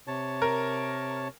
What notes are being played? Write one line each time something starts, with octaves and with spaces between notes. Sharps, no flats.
C3 C#5 A5
A#4